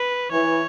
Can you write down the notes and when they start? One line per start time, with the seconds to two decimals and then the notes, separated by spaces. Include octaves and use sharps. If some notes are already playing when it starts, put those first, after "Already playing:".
Already playing: B4
0.32 E3 C#5